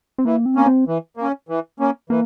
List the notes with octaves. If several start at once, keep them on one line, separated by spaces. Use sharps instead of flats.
C4
E3 A#3
C4
A#3 C#4
C4
E3
A#3 C#4
E3
A#3 C#4
E3 A#3